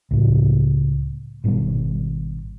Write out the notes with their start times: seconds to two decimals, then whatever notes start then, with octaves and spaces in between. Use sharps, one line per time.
0.11 C#2 A2
1.44 G#1 B2 D#3 G3